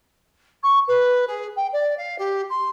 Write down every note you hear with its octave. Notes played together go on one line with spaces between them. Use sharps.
C#6
B4
G#4
G5
D5
F5
G4
C6